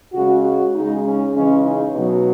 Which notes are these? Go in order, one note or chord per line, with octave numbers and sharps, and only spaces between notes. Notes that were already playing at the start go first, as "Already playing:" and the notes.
C#3 G#3 F#4
F#4
C#3 G#3 D#4
C#4
C#3 E3 G#3 C#4
D#4
B2 F#3